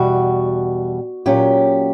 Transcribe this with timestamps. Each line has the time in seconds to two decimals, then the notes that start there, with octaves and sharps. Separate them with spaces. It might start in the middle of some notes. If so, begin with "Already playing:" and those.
Already playing: E2 B2 G3 F#4
1.26 A#2 F#3 C#4 G4